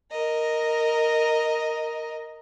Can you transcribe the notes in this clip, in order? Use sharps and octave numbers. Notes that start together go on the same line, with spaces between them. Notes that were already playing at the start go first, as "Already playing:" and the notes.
A#4 D#5